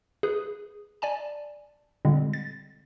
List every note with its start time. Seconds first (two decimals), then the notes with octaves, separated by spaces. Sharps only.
0.23 G#4 B4
1.02 D5 G#5 A5
2.05 A#2 D3 G3 G#3 C4
2.33 A6